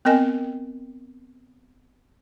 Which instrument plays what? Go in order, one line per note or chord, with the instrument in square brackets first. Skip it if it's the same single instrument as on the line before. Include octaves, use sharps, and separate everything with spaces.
[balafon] B3 C4 A#4 D#5 G#5